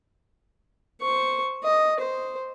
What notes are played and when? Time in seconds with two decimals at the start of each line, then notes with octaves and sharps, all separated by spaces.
1.01 C5 C#6
1.64 D#5
2.00 C5